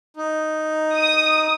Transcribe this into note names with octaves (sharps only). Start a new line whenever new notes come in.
D#4
D#6